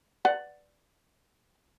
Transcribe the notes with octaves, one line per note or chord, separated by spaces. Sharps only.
B4 D5 F#5